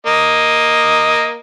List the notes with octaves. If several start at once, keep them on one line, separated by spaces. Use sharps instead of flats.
A#3 D#5